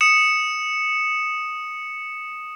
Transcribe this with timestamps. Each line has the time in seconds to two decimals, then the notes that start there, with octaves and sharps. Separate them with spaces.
0.01 D#6 C#7 E7